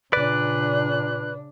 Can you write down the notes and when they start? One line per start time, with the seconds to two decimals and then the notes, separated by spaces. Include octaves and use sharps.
0.13 A#2 C#3 D4 B4 D5 F#6